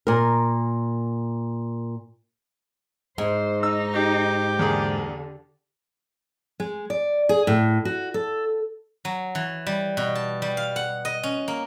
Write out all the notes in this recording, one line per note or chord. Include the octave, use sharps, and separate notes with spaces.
A#2 A#4
G#2 C5
D#4 E6
G4
E2 D3 A#3 G#4
G#3
D5
G#4
A2
F#4
A4
F#3
E3
G3
B2
A5
G3
F5
F#5
D#5
C#4
A#3